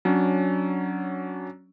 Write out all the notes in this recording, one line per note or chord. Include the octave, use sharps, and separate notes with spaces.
F#3 C#4 D4